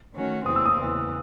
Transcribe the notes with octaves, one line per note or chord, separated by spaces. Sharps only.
D#3 A3 C#4 F#4
E2 C3 E3 C4 D#6
E6
D#6
E2 C#3 E3